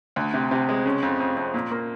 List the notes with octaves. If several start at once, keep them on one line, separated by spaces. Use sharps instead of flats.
D2
C3
C3
G#3
C#3
F2
F2
F2
A#2
A#3